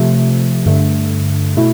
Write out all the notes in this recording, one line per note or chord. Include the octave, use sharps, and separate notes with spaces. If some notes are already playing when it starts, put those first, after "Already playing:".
Already playing: C3 F3 A3
G2 D3 A3
B2 A3 E4